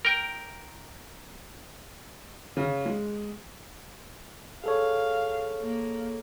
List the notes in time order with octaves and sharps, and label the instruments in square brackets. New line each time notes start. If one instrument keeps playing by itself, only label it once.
[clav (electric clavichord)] A#4 G5
[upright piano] C#3
G#3
[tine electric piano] G#4 A4 C#5 [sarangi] F5
[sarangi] A#3